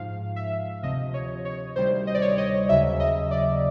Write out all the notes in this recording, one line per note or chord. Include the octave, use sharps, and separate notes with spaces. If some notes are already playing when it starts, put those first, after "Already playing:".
Already playing: G#2 F3 F5
E5
D2 C3 F3 D#5
C#5
C#5
D2 C3 D#3 G3 C5
D#5
D5
C#5
D5
D#5
D#2 C#3 F#3 E5
D#5
D5